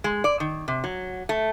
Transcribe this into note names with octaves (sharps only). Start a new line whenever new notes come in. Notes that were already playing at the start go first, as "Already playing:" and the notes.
G#3
D5
D#3
C3
F#3
A3